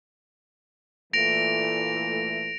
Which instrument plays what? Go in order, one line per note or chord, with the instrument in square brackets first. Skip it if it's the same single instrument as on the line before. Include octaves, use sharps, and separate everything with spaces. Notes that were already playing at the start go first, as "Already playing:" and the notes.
[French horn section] A#2 E3 A3 [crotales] A#6 D7 F7